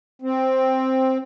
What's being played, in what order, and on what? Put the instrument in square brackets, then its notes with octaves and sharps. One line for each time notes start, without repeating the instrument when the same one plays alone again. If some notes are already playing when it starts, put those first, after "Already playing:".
[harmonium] C4